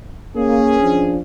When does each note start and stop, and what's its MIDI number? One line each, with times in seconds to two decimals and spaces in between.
0.36 0.77 58
0.36 1.17 61
0.36 1.17 68
0.80 1.18 53
0.80 1.18 62